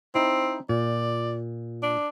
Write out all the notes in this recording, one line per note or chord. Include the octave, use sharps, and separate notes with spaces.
C4 D#4 E4
A#2 D5
D4